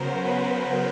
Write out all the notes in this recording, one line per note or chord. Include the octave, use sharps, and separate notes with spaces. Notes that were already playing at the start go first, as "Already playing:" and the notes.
Already playing: C#3 F#3 B3 A#4 C5
B4